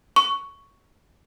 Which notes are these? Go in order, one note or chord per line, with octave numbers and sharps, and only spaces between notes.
C#6